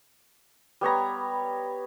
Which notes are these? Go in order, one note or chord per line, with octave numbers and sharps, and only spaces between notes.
G3 B3 C#5 A#5